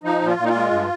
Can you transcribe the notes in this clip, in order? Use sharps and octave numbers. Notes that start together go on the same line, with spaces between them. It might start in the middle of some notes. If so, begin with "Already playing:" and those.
F3 D#4
A#2
F4
A#2
D#4
F4
G#3
G2